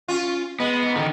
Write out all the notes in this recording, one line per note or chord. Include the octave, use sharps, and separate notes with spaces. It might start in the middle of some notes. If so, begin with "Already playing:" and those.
C#4 F4
G#3 B3
G#2
D3 D#3